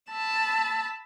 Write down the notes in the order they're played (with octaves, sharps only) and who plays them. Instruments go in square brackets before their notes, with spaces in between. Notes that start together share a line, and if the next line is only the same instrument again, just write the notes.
[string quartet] A5 B5 E6